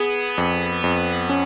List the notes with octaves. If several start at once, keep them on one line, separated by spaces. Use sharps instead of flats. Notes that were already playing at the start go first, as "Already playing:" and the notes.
Already playing: B3 G#4
F2
F2
C#4